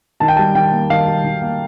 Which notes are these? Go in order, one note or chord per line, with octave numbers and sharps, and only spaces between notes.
D#3 A5
G5
G3 A5
D#3 G5
A#3
D#3 F5
G3
D#3
A#3